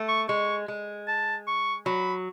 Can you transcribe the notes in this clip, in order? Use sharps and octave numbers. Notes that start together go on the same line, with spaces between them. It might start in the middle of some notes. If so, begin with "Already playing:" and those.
Already playing: A3
C#6
G#3 C#6
G#3
A5
C#6
F#3 B5